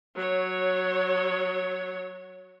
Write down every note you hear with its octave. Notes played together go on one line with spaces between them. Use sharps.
F#3 C#5